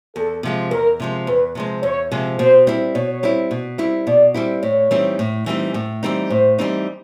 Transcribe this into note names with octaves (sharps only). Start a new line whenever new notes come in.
E2 A4
C3 F3 G#3
E2 A#4
C3 F3 G#3
E2 B4
C3 F3 G#3
E2 C#5
C3 F3 G#3
B2 C5
G3 C4 E4
B2 C#5
G3 C4 E4
B2
G3 C4 E4
B2 D5
G3 C4 E4
A2 C#5
E3 G3 C4 D#4
A2
E3 G3 C4 D#4
A2
E3 G3 C4 D#4
A2 C5
E3 G3 C4 D#4